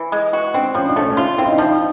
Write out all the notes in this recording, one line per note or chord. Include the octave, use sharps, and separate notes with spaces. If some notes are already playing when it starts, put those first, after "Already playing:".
Already playing: E3
G#3
F#4
C4 D4
F3 C#4
D4
A3 C#4
C#4
D4 F4
C4 E4
D#4
D4
F3 D#4